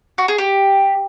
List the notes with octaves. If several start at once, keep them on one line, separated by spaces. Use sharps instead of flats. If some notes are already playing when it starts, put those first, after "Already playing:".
F#4
G#4
G4